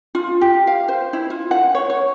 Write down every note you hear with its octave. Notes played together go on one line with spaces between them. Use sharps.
F4
G4
F5
C5
E4
F4
F#5
C#5
C#5